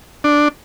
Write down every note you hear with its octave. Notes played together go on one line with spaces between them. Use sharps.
D4